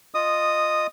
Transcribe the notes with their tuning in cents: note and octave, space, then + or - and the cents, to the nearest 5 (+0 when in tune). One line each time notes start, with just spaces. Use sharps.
F4 +0 D#5 -15 D#6 -5